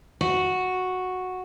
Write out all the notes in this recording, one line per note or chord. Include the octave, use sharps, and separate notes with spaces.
F#4